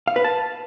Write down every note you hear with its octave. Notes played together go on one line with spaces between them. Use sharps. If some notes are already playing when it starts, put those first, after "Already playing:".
F5
B4
A5